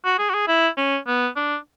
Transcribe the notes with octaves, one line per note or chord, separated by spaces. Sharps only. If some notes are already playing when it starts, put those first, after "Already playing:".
F#4
G#4
F#4
G#4
E4
C#4
B3
D4